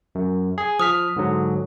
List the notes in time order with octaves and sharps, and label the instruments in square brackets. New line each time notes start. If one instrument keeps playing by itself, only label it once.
[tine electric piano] F#2
G#4
[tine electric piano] F3 F6 B6 [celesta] D#6
[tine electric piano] G#2 D3 F#3